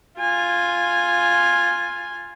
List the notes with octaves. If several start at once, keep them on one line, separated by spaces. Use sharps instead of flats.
F4 G#5